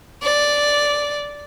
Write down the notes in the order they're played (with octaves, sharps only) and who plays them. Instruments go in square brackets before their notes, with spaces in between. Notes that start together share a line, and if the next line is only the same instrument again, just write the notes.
[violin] D5